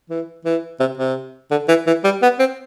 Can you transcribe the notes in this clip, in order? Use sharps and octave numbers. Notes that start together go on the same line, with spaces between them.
E3
E3
C3
C3
D3
E3
E3
G3
B3
C4